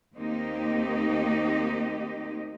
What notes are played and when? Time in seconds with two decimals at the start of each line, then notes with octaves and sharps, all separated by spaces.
0.16 D#2 A#3 C4 D#4 G4 D#5